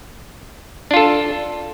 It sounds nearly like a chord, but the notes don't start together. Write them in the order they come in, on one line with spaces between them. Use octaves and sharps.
D4 F4 A4